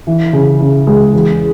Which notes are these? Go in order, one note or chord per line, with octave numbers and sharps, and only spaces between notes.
E3
C#3
C#3
G#3
E2